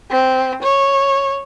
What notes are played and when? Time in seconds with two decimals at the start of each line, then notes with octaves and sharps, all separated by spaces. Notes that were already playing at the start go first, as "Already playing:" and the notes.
0.11 C4
0.62 C#5